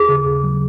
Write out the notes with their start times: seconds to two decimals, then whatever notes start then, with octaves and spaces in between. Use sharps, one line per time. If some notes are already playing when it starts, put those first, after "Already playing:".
Already playing: D#2 G#4
0.09 C#3
0.26 D#2
0.44 F#3